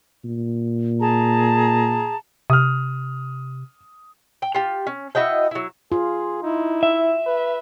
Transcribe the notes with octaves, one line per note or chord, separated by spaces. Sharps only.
A#2
G#4 A5 A#5
C3 D#6 F6
G5
F4 G4
C#4
E4 F#4 D#5 G5
F#3 E4
F4 G#4
D#4 E4
E5
B4